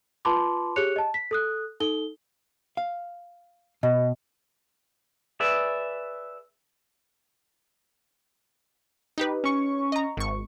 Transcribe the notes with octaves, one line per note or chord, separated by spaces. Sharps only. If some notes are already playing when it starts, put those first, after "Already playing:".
F4 B4 A5 B5 C6 D6
G4 G#4 C#5 F#6 C#7 F7
D#5 A5
B6
A4 D#6 F#6
D#4 A4 G7
F5
B2 D#5
G#4 B4 D5 E5
D#4 G4 B4
C#4 C#6
D#5 A#5
G#1 C#6